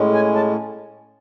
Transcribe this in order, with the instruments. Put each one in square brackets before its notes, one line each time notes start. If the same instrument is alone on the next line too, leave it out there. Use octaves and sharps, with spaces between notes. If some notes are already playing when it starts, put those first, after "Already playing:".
Already playing: [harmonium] A2 G#3 C#4
G#5
A5